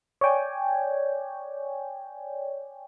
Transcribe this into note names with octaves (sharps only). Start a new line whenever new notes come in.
C#5 D5 G5 G#5